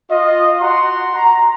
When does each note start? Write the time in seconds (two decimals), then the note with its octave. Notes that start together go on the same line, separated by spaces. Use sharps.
0.11 F4 D#5
0.61 F#4 F#5 A#5 C6
1.16 A#5